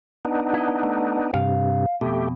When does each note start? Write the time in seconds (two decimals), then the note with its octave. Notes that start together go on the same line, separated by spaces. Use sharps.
0.25 B3 D4 D#4
0.54 E4 D#5
0.83 A3
1.34 G2 C3 F5
2.01 F2 B2 A3 G4